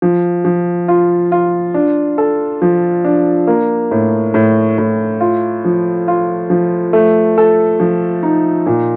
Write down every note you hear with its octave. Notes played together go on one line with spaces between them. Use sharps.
F3
F3
F4
F4
D4
A4
F3
D4
A#3
A2
A2
A2
F4
F3
F4
F3
A3
A4
F3
D#4
A#2